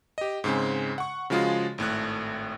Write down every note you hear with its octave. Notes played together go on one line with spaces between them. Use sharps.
G4 D#5
G#2 C#3 G#3 C4
F#5 C#6
C#3 F3 G#3 F4 F#4 G#4
G#1 A2 A3 F#6